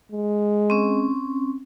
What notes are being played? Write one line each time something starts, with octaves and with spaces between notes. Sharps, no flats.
G#3
C4 C#4